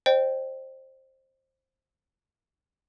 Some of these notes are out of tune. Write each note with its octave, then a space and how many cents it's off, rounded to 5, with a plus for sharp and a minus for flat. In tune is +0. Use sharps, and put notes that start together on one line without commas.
C5 +15 D#5 -40 G5 +0